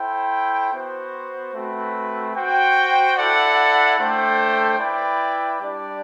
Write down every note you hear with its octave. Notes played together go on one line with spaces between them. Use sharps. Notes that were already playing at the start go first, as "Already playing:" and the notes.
Already playing: E4 A4 C5 G5
B3 F#4 C5
A3 C4 F#4 B4
F#4 C5 G5
E4 A4 D5 F#5
A3 D4 A4 C5 G5
E4 B4 D5 G5
G3 D4 G4 D5